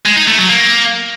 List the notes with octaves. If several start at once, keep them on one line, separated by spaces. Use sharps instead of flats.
G#3
D#4
A3
F#3
A#3